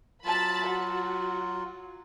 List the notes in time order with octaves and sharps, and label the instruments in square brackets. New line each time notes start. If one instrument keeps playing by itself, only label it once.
[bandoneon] F#3 F4 [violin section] A5 B5
[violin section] F#4